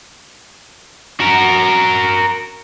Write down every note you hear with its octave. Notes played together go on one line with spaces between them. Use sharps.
F#4 A#4